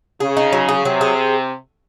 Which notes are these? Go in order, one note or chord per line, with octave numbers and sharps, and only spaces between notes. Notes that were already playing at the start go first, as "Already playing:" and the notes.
C#3 G#4
D#4
F#3
G#4
C3 F#3
G#4